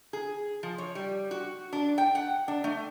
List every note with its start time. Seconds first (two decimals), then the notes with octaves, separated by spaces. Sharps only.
0.13 G#4
0.63 F3
0.78 C#5
0.95 G3
1.31 F#4
1.73 D4
1.98 G5
2.15 F#5
2.48 D4
2.64 A3